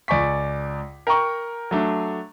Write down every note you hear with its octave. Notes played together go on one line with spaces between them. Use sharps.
C#2 D5 G#5 C#6 B6
A#4 G5 A#5 C#6
F#3 A3 D4